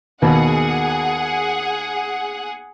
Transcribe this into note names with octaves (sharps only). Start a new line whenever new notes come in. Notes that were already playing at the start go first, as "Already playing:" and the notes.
D#2 B2 G#4 F#5